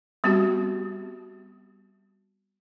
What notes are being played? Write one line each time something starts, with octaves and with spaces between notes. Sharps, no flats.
G3 B3 C4 F#4 G4